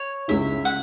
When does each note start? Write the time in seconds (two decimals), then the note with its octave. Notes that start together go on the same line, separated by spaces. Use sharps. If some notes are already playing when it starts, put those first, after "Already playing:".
Already playing: C#5
0.28 C#2 C#3 G#3 C#4 E4 E5
0.65 F#5